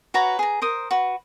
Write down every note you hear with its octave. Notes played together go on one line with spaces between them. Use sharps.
F#4 B4 C#5 A#5
G#4 A#5
A#4 C5 D#6
F#4 B4